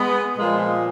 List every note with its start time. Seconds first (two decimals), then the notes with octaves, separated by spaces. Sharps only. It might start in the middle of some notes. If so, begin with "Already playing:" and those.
Already playing: G#3 B3
0.37 A#2 F3 G#3